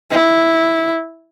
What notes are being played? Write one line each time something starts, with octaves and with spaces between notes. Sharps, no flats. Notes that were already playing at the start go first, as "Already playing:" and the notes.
E4